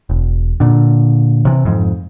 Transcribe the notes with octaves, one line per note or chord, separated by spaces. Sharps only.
E1
A#2 D3
C3 E3
F2 G#2